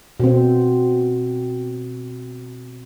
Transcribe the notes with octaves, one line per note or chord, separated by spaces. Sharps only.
B2 C4